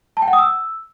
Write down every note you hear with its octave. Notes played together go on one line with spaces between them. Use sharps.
A5
G5
F#5
D#6
E6